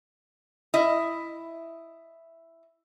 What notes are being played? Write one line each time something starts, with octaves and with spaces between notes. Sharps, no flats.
E4 D#5